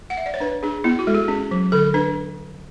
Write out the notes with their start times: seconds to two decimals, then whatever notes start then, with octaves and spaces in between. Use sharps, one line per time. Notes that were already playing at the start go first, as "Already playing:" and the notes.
0.10 F#5
0.17 E5
0.26 D5
0.34 C#5
0.40 D4 B4
0.63 D4 G#4
0.84 B3 E4
0.99 F#4
1.07 G#3 A4
1.15 G#4
1.28 C#4
1.51 F#3
1.72 D3 A4
1.94 D4 B4